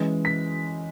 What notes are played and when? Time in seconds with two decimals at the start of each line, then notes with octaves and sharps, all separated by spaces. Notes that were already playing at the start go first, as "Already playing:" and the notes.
Already playing: E3 G#3 C#4
0.25 B6